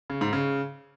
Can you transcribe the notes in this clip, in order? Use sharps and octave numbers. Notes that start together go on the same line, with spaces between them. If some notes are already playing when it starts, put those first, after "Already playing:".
C#3
G#2
C#3